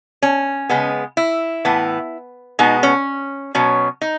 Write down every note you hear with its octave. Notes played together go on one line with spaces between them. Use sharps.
C#4
C#3 G#3 B3
E4
A2 E3 B3
B2 G#3 B3 D#4
C#4
B2 F#3 C#4
D#4